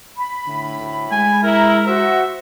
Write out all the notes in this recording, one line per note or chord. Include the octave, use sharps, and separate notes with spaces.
B5
A2 D3
D2
G#3 G#5
E4 A#4 A#5
F#4 C5 E5